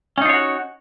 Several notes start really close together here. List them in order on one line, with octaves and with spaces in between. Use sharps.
C#4 D#4 F4 C#5 F#4